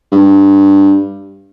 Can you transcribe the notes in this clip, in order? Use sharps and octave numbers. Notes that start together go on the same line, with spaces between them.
G2